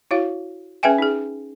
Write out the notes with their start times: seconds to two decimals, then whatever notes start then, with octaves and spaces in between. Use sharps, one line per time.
0.11 E4 F#4 C#5 F5
0.83 C#4 G#4 B4 E5 G5 G#5
0.98 D#4 G#4